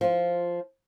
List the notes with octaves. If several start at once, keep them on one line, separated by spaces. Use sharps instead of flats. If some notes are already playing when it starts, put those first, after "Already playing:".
F3 F4